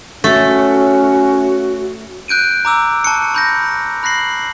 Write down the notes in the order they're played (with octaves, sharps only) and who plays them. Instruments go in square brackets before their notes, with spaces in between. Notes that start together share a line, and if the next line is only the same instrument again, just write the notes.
[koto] A3 [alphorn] C#4 [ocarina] F#4
[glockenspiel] F#6 G6 D7 D#7
A#5 D6 E6
A5 C#6 F#6 C#7
B5 G6 A#6
B5 F#6 A#6 C7 F#7